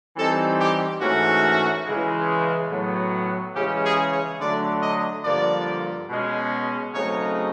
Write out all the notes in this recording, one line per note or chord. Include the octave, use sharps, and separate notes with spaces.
E3 G3 C4 D#4 A4
G4
G#2 E3 A3 C#4 F#4
C#3 E3 G#3
A2 F#3 B3
C#3 E3 G#3 C#4 G4
G#4
C#5
D3 F#3 A3 D4 D5
D#5
G2 D3 F3 A#3 D5
B2 G#3 C#4
C#3 F#3 A3 C4 D#4 C#5